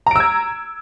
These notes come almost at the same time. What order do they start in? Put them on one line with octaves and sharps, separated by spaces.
A#5 D7 E6 G#6